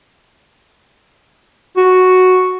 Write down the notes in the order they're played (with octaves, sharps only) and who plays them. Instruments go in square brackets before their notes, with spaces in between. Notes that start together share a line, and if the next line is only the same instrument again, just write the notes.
[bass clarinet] F#4